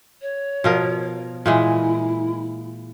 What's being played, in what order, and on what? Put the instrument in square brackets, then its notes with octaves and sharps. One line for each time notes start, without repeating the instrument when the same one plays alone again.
[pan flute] C#5
[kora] B2 F3 A#4
[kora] A#2 E3 G#3 [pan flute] E4